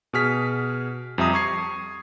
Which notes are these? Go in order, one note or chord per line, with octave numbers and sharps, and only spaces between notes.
B2 G#4 F6 B6
F2 G3 E5 A#5 D#6
C#6 G#6 C7